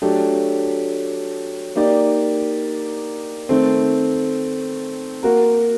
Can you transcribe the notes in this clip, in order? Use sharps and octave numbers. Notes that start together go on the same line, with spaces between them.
F#3 A3 D4 G4
A#3 D#4 G4 D5
D#3 A3 C4
A#3 F#4 A#4